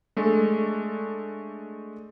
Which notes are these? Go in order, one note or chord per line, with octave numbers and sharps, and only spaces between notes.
G#3 A3 D4 A4